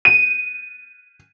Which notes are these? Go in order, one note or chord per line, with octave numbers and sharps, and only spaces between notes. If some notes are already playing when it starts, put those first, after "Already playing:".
D#7